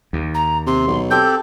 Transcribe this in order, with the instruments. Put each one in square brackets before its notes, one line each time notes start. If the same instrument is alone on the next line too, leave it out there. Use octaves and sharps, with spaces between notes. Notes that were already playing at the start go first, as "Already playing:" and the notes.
[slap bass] D#2
[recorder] A#5
[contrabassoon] C3 [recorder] C6
[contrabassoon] B1
[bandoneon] C4 G4 A4 [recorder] G6